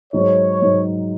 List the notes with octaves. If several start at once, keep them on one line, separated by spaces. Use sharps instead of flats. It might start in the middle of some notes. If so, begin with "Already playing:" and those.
G#2 F#3 D#4 C#5
G#2 F#3 D#4